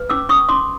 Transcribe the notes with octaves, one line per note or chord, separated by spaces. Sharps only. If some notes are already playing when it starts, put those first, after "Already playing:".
Already playing: B4
C#4 D6 E6
C#4 C#6 D#6
C#4 C6 D6